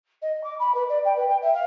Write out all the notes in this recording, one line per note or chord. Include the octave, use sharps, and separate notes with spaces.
D#5
D6
B5
B4
D5
G5
B4
G5
E5
F5